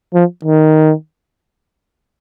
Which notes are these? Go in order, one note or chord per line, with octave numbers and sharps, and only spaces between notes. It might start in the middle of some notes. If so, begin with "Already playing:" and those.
F3
D#3